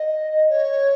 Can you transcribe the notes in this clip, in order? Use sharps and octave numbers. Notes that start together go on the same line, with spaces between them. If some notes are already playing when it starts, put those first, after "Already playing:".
Already playing: D#5
C#5